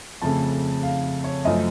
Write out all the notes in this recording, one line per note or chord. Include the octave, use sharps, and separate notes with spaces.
F2 C#3 A3 A5
F5
C#5
F#2 F3 A3 D#5